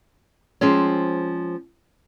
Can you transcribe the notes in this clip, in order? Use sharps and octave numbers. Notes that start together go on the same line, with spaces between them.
F3 G#3 C4 C#4